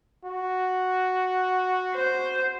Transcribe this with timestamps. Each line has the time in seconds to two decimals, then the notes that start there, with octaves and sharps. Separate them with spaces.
0.24 F#4
1.95 C5